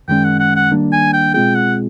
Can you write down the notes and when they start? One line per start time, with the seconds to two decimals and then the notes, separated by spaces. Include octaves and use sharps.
0.08 F#2 D#3 G#3 C#4 G5
0.25 F#5
0.40 F#5
0.56 F#5
0.71 D#3 G3 A#3 D4
0.92 G#5
1.13 G5
1.34 B2 G#3 C4 F4 G#4 G5
1.55 F#5